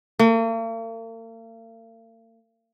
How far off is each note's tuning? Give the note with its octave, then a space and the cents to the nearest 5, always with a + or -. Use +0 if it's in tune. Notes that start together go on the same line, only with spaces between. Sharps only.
A#3 -45